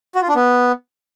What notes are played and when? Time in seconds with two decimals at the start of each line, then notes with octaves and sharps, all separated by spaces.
0.15 F#4
0.22 F4
0.28 D4
0.35 B3